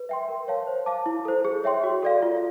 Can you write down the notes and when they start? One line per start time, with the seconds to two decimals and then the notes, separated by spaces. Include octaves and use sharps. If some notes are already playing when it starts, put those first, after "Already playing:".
Already playing: B4
0.09 E5 G5 C6
0.29 A#4
0.48 C#5 F5 A5
0.67 C5
0.86 F5 A5 D6
1.06 E4
1.25 A4 C5
1.45 G#4
1.64 C#5 E5 G5 C6
1.84 F#4
2.03 A4 D5 F5
2.22 F4